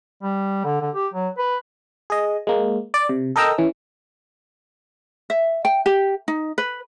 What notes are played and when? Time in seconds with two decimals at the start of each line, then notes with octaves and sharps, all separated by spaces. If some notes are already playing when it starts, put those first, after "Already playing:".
0.23 G3
0.65 D3
0.81 D3
0.95 G4
1.14 F#3
1.38 B4
2.10 G#4 D#5
2.47 G#3 A#3
2.94 D5
3.09 C3
3.36 A4 A#4 D#5 G5 A#5 E6
3.58 E3 C#4
5.30 E5
5.65 G5
5.86 G4
6.28 D#4
6.58 B4